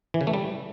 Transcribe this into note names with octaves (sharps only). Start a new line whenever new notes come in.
E3
C#3
A3
G3